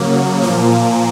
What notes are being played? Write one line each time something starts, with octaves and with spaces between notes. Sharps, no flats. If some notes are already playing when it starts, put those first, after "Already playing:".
Already playing: C#3 F#3 A#3
A#2 F3 A#3